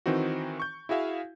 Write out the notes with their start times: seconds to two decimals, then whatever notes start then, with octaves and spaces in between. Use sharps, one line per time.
0.06 D#3 E3 C4 D#4 F#4
0.60 C#6 G6
0.89 E4 F#4 G#4 E5 F5